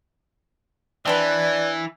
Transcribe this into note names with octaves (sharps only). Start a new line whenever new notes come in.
E3 C4 D4 B4 D5